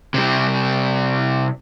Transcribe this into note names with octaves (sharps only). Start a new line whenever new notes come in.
C3 G3